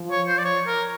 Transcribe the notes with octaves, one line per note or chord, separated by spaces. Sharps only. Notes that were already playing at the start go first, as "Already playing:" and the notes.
Already playing: F3
C#5
C5
D5
C#5
A#4